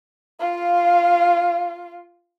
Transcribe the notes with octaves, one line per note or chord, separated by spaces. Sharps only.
F4 F5